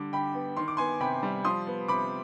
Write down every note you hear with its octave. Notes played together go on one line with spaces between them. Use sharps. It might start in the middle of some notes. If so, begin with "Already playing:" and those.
Already playing: D3 G3 D6
D3 G5 B5
B3
D#3 C6
D6
B3 G#5 C6
C3 G5 B5
G3
F3 C6 D#6
B3
C3 B5 D6